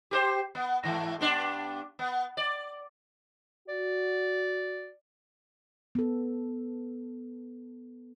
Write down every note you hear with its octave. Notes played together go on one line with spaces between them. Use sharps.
G4 A#4 C5
B3
G#2 E3 A3
G2 B3 D4
B3
D5
F#4 D5
B3 A4